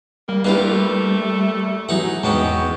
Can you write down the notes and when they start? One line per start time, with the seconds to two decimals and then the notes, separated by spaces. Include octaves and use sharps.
0.29 G3 A#3
0.45 A3 A#3 D4 E4 F4 G4 B4
1.89 E3 F#3 D#4 F#5
2.23 E2 G#2 F#3 B3 C#4 G5